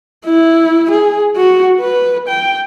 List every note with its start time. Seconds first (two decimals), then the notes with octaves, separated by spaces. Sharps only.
0.25 E4
0.91 G#4
1.36 F#4
1.81 B4
2.28 G5